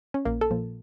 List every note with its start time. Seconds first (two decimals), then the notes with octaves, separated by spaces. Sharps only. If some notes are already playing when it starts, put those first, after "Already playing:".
0.14 C#4
0.25 A#1 A#3
0.41 A4
0.51 A#2 F3